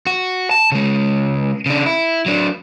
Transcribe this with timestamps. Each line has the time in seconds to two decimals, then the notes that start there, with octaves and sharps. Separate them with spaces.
0.07 F#4
0.51 A5
0.72 C#3 G#3
1.66 C#3 D4
1.86 E4
2.26 F#3 D4